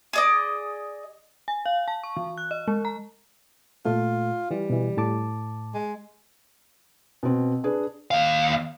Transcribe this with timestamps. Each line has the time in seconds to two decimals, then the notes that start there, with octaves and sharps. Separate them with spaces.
0.13 G#4 D5 D#5
1.48 G#5
1.66 F5
1.88 A5
2.04 C#6
2.16 E3
2.38 F#6
2.51 D#5
2.68 G#3
2.85 A#5
3.85 A#2 A3 F4
4.51 E3 G3
4.70 B2 E3
4.97 A2 A5 D6
5.74 G#3
7.23 B2 C4
7.64 D4 G#4 B4
8.11 D#2 F5